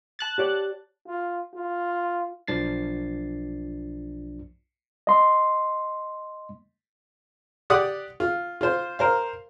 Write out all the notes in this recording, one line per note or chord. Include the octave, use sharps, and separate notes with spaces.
A5 F#6 A6
G4 C#5 D5
F4
F4
B1 F3 D4 A6 C7
D#5 C6
G4 D5 F#5 D#6
F4
F4 C5
A#4 C5 F5